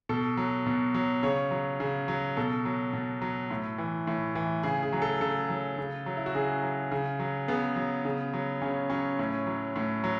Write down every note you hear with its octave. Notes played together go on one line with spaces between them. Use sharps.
B2 A4
F#3
B2
F#3
C#3 C#5
F#3
C#3
F#3
B2 A4
F#3
B2
F#3
A2
E3
A2
E3
C#3 G#4
G#4
F#3
A4
C#3 A4
F#3
C#3
F#3
E4
F#4
C#3 G#4
F#3
C#3
F#3
C#3 B3
F#3
C#3
F#3
C#3 C#4
F#3 C#4
A2
F#3
A2
F#3